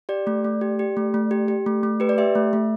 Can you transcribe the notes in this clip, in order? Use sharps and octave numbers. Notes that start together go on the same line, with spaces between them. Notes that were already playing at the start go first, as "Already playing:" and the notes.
G4 D5
A3
A3
G4
G4
A3
A3
G4
G4
A3
A3
G4 B4
D5
G4 E5
A3
A3